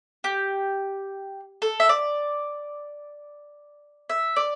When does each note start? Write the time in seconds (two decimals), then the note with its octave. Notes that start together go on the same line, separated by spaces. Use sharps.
0.24 G4
1.62 A4
1.80 E5
1.89 D5
4.10 E5
4.36 D5